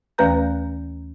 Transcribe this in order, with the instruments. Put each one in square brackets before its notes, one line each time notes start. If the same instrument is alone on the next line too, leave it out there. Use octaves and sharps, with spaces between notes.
[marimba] D#2 E3 A3 B4 A#5 G6